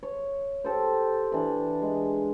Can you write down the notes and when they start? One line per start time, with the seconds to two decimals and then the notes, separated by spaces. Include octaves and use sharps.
0.03 C#5
0.64 G4 A4 C5
1.32 E3 D4 B5
1.82 G#3